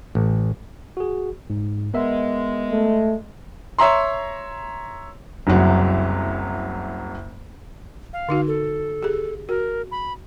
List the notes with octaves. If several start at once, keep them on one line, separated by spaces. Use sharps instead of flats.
A1
F#4 G#4
G#2
G#3 B3 A#4 E5
A3
C#5 E5 A#5 C6
F#1 C2 F#3
F5
D3 D#4 F#4
A4
G4 G#4
F#4 A#4
B5